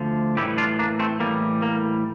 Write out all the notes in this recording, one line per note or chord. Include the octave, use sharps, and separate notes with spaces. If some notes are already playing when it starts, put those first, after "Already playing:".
Already playing: D2 D3 F3
A2 E3 G3 E4 G4
D4 F4
A#3 D4
A3 C4
A2 E3 G3 A#3
A#3